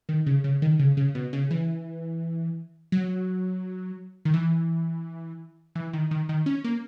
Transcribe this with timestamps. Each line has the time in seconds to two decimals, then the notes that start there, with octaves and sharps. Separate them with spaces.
0.09 D#3
0.26 C#3
0.44 C#3
0.62 D#3
0.79 C#3
0.97 C#3
1.15 B2
1.33 C#3
1.51 E3
2.92 F#3
4.25 D#3
4.34 E3
5.75 E3
5.93 D#3
6.11 D#3
6.29 D#3
6.46 C#4
6.64 A#3